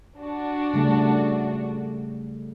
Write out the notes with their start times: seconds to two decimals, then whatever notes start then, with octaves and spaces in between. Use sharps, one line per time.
0.19 D4 F#4
0.74 C#3 G3 A3